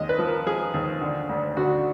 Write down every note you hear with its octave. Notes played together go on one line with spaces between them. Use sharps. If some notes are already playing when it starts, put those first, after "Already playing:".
Already playing: D#2 G#3 D#5
B4
F3
A#4
F3 G#4
D#2
D3
D2
D3 F#4